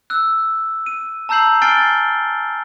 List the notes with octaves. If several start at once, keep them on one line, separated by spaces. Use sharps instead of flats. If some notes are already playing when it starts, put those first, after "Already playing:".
E6 F#6
D#7
A5 A#5 E6 G6 C7 F#7
G#5 F6 A6 C7 D7 G7